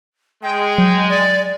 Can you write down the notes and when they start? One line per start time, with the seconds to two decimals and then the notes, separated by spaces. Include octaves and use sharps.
0.43 G#3 G5
0.78 F#3
1.09 D5